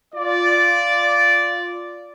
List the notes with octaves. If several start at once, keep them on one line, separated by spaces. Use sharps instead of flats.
F4 D5